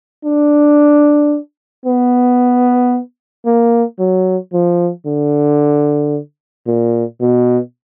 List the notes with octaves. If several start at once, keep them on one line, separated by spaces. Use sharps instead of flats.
D4
B3
A#3
F#3
F3
D3
A#2
B2